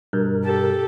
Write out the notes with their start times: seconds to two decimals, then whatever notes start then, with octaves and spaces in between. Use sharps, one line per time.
0.13 G2 B2 A#4
0.45 G4 A4